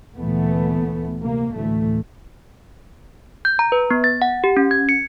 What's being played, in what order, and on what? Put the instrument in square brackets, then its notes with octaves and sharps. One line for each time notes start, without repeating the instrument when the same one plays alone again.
[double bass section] D2 A#2 E3 A3 B3
C3 A#3
D2 A2 E3 A3
[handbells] G6
A#5
B4
B3
A6
F#5
G4
C#4
G#6
C#7